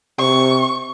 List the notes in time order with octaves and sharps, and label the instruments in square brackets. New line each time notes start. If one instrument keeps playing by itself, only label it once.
[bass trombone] C3 [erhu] C#6